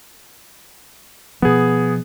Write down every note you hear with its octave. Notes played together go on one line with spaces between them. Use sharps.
B2 F3 B3 G#4